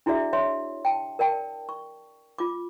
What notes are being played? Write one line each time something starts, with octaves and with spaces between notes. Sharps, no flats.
D4 E4 F#4 G#4 D5 E5
C#5 E5 C6
G5 A5
A#4 D5 G5 A5
C#6
F4 D6